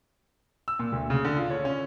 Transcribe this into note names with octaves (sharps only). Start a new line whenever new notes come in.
E6
A#2
D2
C#3
D3
F4
C#5
C#4